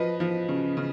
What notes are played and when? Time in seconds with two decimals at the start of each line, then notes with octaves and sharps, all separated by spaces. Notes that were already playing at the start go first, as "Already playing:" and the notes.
Already playing: F3 B4 D#5
0.20 F3
0.49 C#3
0.77 C#3